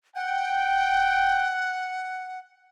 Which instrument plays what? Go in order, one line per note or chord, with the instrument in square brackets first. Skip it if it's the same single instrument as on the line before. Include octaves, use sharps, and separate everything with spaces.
[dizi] F#5 [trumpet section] G5